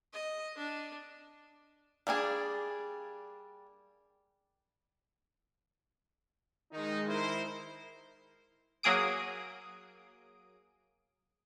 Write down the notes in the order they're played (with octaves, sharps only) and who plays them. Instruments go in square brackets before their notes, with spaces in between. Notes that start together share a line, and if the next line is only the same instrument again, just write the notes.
[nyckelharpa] D#5
D4
[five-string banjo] G3 A#3 D4 G#4
[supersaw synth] D#3 G#3 [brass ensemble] D#4
[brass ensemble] E4 A#4 C5
[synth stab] F#3 A#3 G#4 D#6 D7